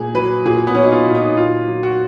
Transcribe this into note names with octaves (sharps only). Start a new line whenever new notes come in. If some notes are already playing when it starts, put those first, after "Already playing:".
Already playing: A#2 A#3 G#4
F#3 B4
A#2 G#4
B3
F#3 C#4
D#4
F4
A#2
D#4
A#2 F4
F#3
F#4